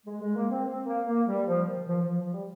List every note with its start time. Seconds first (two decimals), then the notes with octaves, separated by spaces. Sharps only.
0.06 G#3
0.21 G#3
0.36 A#3
0.51 C4
0.66 C4
0.86 A#3
1.07 A#3
1.28 G3
1.48 F3
1.68 D#3
1.87 F3
2.02 F3
2.18 F3
2.33 G3